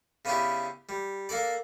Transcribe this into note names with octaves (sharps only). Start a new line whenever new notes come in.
C#3 B3 C#4 D4 E4 G4
G3
A#3 D4 A4 D5